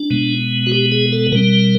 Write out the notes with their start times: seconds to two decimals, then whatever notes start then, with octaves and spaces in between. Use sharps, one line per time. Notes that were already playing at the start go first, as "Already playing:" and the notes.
Already playing: D4
0.10 B2 G#3 B3
0.67 F#4
0.72 G4
0.92 G#4
1.12 A4
1.32 B2 G3 C4 A#4